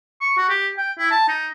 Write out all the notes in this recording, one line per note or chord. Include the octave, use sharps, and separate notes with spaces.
C#6
F#4
G4
G5
E4
A5
D#4